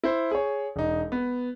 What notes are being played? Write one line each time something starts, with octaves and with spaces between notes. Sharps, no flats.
E4 C5
G#4 C#5
E1 D#4
B3